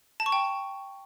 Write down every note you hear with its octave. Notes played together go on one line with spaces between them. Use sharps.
A5
C#6
G5